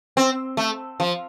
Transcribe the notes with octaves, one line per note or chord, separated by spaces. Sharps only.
C4
A3
F3